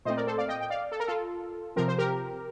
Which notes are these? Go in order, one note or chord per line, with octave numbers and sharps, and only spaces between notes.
A#2 A3 C4 C5 D#5
A#4 D5
A4 C5
D5 F5
D#5 G5
G5
D5 F5
A4
A#4
F4 A4
C3 F3 C4 A#4
C5
G4 A#4